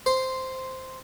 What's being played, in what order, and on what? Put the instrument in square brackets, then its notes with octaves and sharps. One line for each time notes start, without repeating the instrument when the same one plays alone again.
[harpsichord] C5